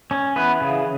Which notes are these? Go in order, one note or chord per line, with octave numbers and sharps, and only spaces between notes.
C#4
E3 B3 B4
C#3